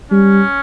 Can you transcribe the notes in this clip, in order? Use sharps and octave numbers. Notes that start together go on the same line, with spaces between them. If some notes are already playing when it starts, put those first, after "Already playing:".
G3 C#4